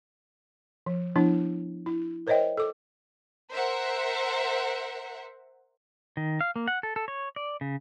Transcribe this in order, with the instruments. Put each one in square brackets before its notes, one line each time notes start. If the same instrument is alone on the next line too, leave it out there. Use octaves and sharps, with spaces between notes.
[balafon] F3
F3 B3 D4 E4
E4
A#4 C5 C#5 D#5 E5 G5
A4 D6
[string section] A#4 C5 E5 F#5
[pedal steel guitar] D#3
F5
A#3
F#5
A4
A4
C#5
D5
C#3